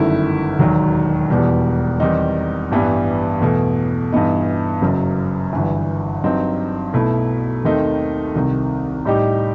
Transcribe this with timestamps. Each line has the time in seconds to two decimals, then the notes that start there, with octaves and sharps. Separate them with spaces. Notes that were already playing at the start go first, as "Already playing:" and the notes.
Already playing: G1 F#2 D#3 A3 E4
0.59 E1 D#2 D#3 F#3
1.30 E1 E2 B2 G3
2.00 E2 D#3 G3 C4 D#4
2.71 A1 G2 E3 G3 B3
3.41 E2 B2 A3
4.12 G2 E3 B3 D#4
4.82 F#1 F#2 F#3
5.53 G1 G2 E3
6.24 G2 F#3 C4 D#4
6.94 B1 B2 A3 E4
7.65 D#2 D#3 A3 C4 D#4
8.35 C2 C3 D#3
9.05 A2 G3 D#4 G4